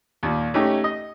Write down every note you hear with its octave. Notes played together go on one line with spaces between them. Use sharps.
D#2 A#2
A3 C#4 D#4 G4
D#5